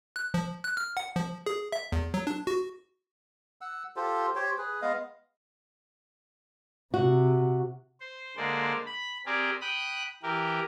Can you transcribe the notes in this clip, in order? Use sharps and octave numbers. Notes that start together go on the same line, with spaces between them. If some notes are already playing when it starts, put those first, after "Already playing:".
F#6
F3
F#6
F6
F#5
F3
G#4
E5
E2
F#3
D4
F#4
F#5 E6
F4 G4 A4 C5
G4 C5 C#5 G5
G#4 B4
G#3 B3 D#5 F5
C3 F#4
C5
D3 G#3 A#3 C5 D5
B5
C4 G4 G#4 A#4 D5
G5 B5 D#6 F#6
E3 G4 A#4